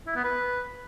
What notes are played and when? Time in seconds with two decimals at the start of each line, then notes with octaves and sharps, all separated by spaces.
0.07 E4
0.16 B3
0.24 B4